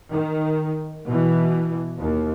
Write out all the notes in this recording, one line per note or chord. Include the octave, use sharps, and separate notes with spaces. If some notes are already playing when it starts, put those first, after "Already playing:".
D#3
B2 E3
D#2